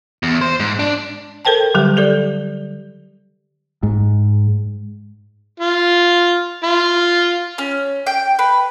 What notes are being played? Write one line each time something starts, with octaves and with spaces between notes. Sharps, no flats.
E2
C5
G#2
D4
A4 A#4 C5 G5 A5
D3 F#3 G3 G4
G4 A4 D5
G#2
F4
F4
C#4
G5
B4